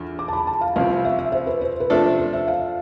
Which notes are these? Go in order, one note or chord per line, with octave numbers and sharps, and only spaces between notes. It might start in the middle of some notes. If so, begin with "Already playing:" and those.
Already playing: E2 D3 F3
D6
A5
B5
A5
F5
C2 C3 F3 C4 F5
E5
E5
C5
B4
C5
B4
C3 F3 A3 D4 A4 C5
C5
E5
F5